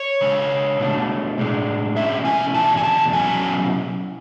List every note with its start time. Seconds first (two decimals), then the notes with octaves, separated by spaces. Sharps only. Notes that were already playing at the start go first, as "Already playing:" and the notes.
Already playing: C#5
0.21 C#3 G#3 D4
0.80 B2 A3 D4
1.38 A2 G#3 D4
1.96 B2 A3 C#4 E4 E5
2.25 G#5
2.54 E2 B2 A3 D4 A5
2.77 G#5
2.83 A5
3.13 B2 F#3 C#4 E4 G#5